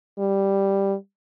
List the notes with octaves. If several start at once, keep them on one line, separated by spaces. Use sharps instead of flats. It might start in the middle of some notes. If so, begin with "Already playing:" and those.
G3